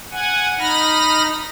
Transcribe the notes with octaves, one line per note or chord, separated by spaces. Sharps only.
F#5 G#5
D#4 B5 F6 A#6